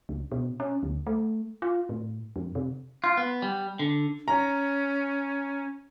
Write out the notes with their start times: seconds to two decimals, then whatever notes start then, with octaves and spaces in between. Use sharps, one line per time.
0.09 C#2
0.32 B2
0.60 C#4
0.83 D2
1.07 A3
1.62 F4
1.89 A2
2.36 F2
2.55 C3
3.04 F4
3.17 B3
3.42 G3
3.79 D3
4.28 C#4 A#5